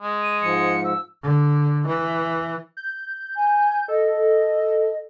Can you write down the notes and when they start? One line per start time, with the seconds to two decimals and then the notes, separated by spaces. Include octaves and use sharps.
0.02 G#3
0.22 D#7
0.42 G#2 F3 C#7
0.84 E6
1.23 D3
1.87 E3
2.77 G6
3.36 G#5
3.88 A4 D#5